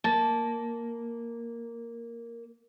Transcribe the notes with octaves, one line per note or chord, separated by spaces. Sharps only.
A#3 A5